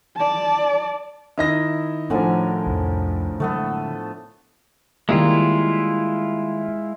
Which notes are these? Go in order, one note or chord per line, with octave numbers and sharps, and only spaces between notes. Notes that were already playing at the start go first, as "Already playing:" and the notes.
D5 A5
D#3 E4 D#5 A#6
A2 D3 F3 C#4 D4 A#4 G#5
C2 F2
D3 F#3 G#3 A3 B3 A4
D#3 G3 G#3 A#3 E4 F4